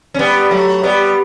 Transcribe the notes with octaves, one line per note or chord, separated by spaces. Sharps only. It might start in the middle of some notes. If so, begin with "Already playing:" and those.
C#4
G3 B3
F#3 A3
G3 B3